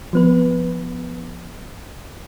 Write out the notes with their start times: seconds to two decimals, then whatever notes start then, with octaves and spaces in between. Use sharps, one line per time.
0.13 F3 B3 B4